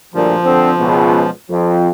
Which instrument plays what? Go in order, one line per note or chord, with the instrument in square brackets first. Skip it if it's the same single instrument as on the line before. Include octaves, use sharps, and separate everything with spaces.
[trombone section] D2 G2 A#2 [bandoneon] F3
[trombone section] D3 C4
C#2 B2
F2 F3